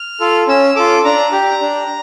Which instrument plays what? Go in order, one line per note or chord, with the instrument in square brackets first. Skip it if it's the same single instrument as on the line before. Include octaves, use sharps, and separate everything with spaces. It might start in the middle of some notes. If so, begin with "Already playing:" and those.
Already playing: [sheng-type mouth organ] F6
F4 A4
C#4 E6
F4 A4 D6
D4 A#5
G4
D4